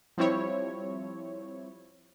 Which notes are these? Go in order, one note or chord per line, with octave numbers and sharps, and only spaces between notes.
F3 G3 C4 E4 C#5